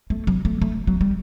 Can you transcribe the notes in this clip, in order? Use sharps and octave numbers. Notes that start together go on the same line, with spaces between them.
A3
F#3
A3
A3
F#3
G3